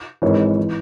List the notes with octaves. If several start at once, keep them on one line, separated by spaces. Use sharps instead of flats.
G#1 G#2 E3 C#5
E3